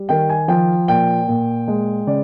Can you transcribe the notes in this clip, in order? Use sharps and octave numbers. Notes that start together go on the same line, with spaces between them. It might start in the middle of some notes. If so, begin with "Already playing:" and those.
Already playing: G3
D#3 G5
G#5
F3 G5
A#2 G5
A#2
G#3
C#3 D5